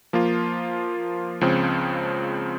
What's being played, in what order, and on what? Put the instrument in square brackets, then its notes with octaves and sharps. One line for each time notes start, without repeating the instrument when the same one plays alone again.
[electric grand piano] F3 A#3 F4
C#2 C#3 F3 C4